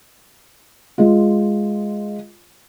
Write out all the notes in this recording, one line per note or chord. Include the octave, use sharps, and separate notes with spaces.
G#3 F4